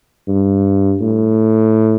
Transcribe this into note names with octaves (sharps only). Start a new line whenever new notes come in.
G2
A2